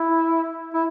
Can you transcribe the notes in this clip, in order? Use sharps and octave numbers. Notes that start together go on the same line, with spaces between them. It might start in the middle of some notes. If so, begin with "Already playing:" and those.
Already playing: E4
E4